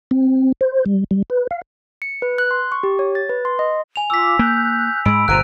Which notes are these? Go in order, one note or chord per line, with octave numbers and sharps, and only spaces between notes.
C4
C5
G3
G3
B4
F5
C#7
B4
F#6
C6
C#6
G4
C#5
A6
B4
C6
D#5
G#5 F7
F4 D6 E6 B6
A#3 F#6 G6
G#2 G#3 B5 E6 D7
G1 A#2 C5 A#5 F#6 D7 D#7